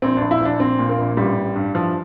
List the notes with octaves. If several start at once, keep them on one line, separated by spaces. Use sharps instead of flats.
A#1 C4
A#1 D4
E4
A#1 D4
A#1 C4
A#2
A#3
A#1
A1 G3
A1
G2
E3 F3